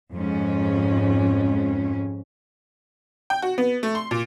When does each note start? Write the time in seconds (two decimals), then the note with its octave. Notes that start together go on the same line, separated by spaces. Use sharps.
0.13 F2 G#2 C#4
3.30 G5
3.42 F#4
3.58 B3
3.83 A3
3.95 C6
4.11 A#2